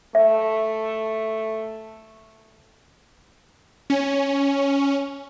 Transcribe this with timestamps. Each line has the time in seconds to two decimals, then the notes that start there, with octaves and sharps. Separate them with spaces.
0.15 A3 E5
3.90 C#4